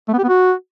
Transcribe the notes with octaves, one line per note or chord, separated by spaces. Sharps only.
A3
B3
G4
B3
F#4